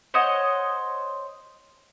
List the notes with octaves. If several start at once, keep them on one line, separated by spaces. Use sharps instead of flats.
C5 C#5 D#5 F#5